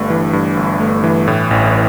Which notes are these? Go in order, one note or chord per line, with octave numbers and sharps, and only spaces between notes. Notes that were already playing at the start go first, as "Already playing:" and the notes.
Already playing: G1 G2 A3
E3
G2
G1
A3
E3
A2
A1